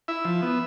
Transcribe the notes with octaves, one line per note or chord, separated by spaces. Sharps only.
E4 E5
F3
B3